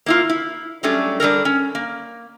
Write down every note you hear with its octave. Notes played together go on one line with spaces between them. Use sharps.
A#3 E4 F4
E4
F#3 G3 A3 C#4 D4
G3 D4 A4 A#4
C#4
A#3